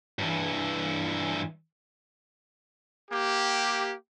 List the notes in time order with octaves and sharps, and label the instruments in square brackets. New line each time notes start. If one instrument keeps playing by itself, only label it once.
[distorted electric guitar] G2 E3
[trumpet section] A#3 G4